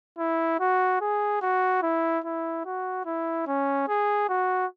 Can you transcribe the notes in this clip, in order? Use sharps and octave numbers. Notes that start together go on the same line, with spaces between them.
E4
F#4
G#4
F#4
E4
E4
F#4
E4
C#4
G#4
F#4